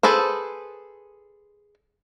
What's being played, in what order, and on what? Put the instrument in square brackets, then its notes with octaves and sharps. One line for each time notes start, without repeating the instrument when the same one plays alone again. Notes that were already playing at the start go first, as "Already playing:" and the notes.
[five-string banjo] G#4 A4 B4 C5